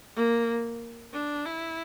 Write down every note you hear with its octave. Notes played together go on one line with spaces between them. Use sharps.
A#3
D4
E4